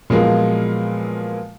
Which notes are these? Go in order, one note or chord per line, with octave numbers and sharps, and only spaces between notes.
A#2 F3 F#3 G#3 A#3 B3